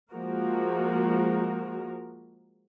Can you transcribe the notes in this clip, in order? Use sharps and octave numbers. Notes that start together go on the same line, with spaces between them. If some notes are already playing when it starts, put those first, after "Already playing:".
F3 G#3 A#3 F#4 A#4